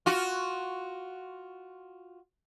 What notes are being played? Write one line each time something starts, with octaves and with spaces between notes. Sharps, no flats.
F4 F#4